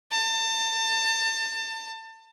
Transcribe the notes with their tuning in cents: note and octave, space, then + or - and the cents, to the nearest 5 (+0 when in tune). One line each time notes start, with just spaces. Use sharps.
A5 +30